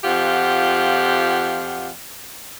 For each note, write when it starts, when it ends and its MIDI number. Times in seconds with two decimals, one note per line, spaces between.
0.04 1.89 41
0.04 1.89 65
0.04 1.89 67
0.04 1.89 78